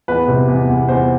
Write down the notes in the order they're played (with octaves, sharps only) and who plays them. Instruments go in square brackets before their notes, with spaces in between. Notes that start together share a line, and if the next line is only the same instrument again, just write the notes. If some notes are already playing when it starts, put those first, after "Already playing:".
[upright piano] E2 B4
C3
E2
E2
E2 C5